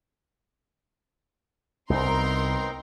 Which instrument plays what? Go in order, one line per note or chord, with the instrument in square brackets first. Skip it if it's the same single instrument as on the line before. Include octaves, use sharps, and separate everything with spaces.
[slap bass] C2 [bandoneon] B3 C4 D#4 [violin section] A#4 A#5 C6